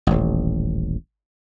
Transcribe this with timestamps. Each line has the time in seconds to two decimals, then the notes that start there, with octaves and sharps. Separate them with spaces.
0.07 D#1 A1